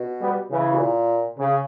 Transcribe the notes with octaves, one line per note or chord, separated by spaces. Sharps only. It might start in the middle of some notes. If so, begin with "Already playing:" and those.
Already playing: B2
G3 B3
C#3 E3
B2
A#2
C#3